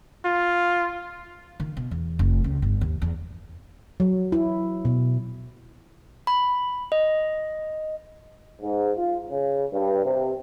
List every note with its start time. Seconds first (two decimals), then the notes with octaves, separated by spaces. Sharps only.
0.25 F4
1.60 D#3
1.77 B2
1.91 E2
2.19 F1
2.44 C#2
2.62 G1
2.81 D#2
3.02 E2
4.00 F#3
4.32 E4
4.85 B2
6.27 B5
6.92 D#5
8.62 G#2
8.97 F4
9.31 C#3
9.72 G2
10.05 C3